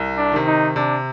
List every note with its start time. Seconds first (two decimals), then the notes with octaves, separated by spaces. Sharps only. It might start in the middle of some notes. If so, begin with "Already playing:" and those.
Already playing: C2
0.17 D4
0.32 C3 D#3
0.47 D#4
0.76 C3 D4